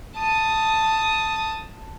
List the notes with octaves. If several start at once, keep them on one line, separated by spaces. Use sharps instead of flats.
A5 D#6